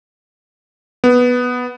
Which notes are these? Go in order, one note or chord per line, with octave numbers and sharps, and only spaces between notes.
B3